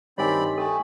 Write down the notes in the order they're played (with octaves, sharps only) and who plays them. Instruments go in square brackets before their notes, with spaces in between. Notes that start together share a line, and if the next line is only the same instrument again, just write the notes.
[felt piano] G2 D#3 [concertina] C4 D5 B5 [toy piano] C#5 G#5
[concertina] A3 [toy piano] A4 [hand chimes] G5 G#5